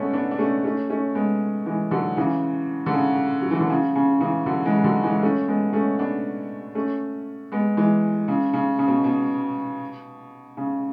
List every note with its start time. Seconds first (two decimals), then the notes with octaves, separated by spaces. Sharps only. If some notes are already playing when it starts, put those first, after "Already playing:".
Already playing: D3 G#3 A3 B3 C#4
0.13 B3 D4
0.31 D4
0.39 A3 C#4
0.64 A3 C#4
0.90 A3 C#4
1.15 G#3 B3
1.66 E3 G#3
1.91 D3 F#3
2.17 C#3 E3
2.86 D3
2.93 C#3
3.41 F#3
3.51 E3
3.60 D3
3.70 C#3
3.95 C#3
4.20 C#3 E3
4.46 D3 F#3
4.65 E3 G#3
4.84 D3 F#3
5.03 E3 G#3
5.22 A3 C#4
5.48 G#3 B3
5.73 A3 C#4
5.99 B3 D4
6.75 A3 C#4
7.52 G#3 B3
7.77 E3 G#3
8.28 C#3
8.53 C#3
8.79 C#3
8.88 B2
9.04 B2
10.57 C#3